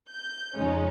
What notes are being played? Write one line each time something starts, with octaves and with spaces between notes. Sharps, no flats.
G6
F2 C#3 F3 G#3 C#4 D#4